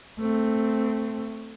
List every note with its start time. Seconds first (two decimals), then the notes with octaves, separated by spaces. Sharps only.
0.19 A3 C4